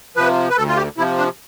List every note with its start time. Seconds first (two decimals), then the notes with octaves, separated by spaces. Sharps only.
0.16 C3 F3 B4
0.50 B4
0.56 D2 A4
0.68 F4
0.77 G4
0.97 C3 F3 E4
1.18 D4